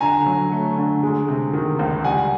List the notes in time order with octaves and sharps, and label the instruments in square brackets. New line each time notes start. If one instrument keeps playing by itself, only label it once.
[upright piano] D3 [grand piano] G#5 A#5
[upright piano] F#3
A3
D3
G#3
C3
D#3
C#2
[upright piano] G3 [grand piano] F#5 G#5